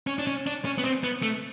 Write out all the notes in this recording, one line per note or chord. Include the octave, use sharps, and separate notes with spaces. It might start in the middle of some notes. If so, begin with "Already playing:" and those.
C#4
D4
C#4
D4
C#4
B3
C4
B3
A3